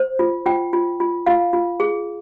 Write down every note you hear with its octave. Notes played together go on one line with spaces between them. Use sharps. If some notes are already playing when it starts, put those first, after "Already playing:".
Already playing: C5
F4
F4 G5
F4
F4
F4 F5
F4
G#4